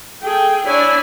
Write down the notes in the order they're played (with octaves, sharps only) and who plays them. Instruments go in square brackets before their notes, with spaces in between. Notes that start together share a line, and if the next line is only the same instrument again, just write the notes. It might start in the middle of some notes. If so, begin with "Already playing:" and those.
[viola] G#4 [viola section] A4 G5
[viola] D4 G#5 [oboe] E4 [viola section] C#5 D5